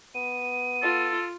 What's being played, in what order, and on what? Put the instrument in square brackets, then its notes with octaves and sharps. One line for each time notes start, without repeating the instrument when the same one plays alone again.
[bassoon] B3 [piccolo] D#7
[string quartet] F4 [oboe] A4